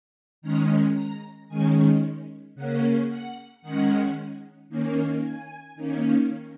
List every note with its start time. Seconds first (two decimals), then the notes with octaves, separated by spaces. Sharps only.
0.42 D#3 G#3 C#4 A#5
0.95 A#5
1.49 D#3 G#3 C#4 G#5
2.55 C#3 A#3 C#4 F#5
3.09 F#5
3.62 D#3 G#3 C#4 F#5
4.69 D#3 A#3 C#4
5.22 G#5
5.76 D#3 A#3 C#4